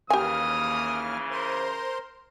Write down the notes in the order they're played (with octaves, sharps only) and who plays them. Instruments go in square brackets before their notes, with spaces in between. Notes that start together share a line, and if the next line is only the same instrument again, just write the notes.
[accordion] D#2 A#3 F6 [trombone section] C#3 E3 [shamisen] G4 G#5 [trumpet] D#6
[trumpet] A#4 [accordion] C5 C6